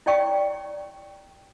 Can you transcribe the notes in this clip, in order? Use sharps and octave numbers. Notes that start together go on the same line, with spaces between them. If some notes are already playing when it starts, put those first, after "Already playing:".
E4 C#5 D5 G5 C#6